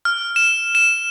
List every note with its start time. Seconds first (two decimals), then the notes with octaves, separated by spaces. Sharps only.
0.05 F6
0.36 E7
0.75 E7